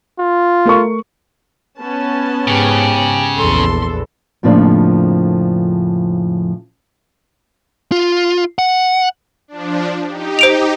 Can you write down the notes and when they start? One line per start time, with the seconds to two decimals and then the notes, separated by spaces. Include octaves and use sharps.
0.19 F4
0.65 A3 A#4 C#6
1.80 B3 C#4 A5
2.48 G#2 C#3 G4
3.38 A#1 E2 A4 C6
4.43 F2 A2 C#3 F3 A#3 D4
7.92 F4
8.59 F#5
9.48 F3 D4
10.07 D#4 G4
10.39 C5 D7 F7